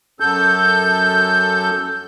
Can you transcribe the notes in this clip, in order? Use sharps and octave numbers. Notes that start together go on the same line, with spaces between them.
F#2 A4 G6